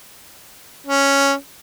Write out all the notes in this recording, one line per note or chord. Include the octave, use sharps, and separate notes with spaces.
C#4